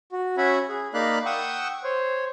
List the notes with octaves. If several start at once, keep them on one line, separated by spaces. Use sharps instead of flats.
F#4
C#4 F#4 E5 F#5 G#5 B5
G#4
A#3 D#4 D5 F5 B5 F#6
F#5 G5 C#6 D#6 E6
C5 C#5